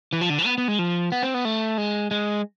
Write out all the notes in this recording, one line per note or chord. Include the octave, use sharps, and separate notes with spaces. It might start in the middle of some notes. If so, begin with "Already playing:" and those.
E3
F3
D3
E3
B3
B3
G#3
F3
B3
C4
B3
A3
G#3
G#3